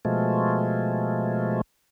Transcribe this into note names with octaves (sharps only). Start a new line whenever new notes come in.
B2 F3 G#3 A3